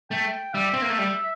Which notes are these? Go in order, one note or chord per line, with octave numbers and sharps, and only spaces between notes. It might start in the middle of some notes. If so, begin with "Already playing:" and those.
A3 G5
G3 E5
C4
A#3
A3
G3